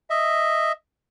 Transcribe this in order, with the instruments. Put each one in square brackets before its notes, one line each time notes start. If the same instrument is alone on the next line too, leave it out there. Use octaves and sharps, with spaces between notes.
[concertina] D#5 E5